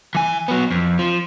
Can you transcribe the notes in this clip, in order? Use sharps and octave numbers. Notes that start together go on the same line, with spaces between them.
E3 G#5
F#3 B3
F2
F3